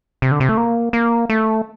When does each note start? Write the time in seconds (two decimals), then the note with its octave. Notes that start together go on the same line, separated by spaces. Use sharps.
0.22 C3
0.32 D3
0.40 C3
0.49 A3
0.57 A#3
0.93 A#3
1.30 A3